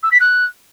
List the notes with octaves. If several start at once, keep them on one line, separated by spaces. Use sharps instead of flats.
E6
B6
F#6